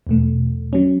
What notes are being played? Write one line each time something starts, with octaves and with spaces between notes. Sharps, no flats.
E2 B2 A3
F#3 C#4